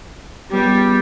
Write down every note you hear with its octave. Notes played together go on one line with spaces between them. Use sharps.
C#2 G3 B3 G4